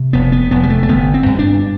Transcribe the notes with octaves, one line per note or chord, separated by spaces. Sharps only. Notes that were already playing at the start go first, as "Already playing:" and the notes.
Already playing: C3
F1 B3
B3
F1 B3
G3
A3
A3
G1 B3
C4
G2
D4